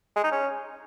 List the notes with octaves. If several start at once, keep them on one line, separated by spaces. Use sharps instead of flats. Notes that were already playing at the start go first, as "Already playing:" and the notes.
G#3
D#4
C#4